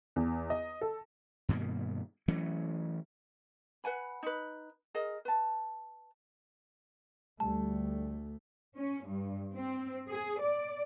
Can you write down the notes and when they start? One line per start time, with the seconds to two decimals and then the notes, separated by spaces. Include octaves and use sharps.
0.16 E2
0.50 D#5
0.81 A4
1.49 G2 B2 D#3 A#3
2.28 E3 F#3 A3 C#4
3.84 B4 F#5 G#5 B5
4.23 D#4 B4
4.95 G#4 A#4 D#5
5.25 B4 A5
7.40 D2 G3 A3 A5
8.75 C#4
9.07 G2
9.53 C4
10.09 G#4
10.41 D5